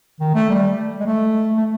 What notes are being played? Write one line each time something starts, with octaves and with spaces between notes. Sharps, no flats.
D#3
A3
G3
G#3
A3
A3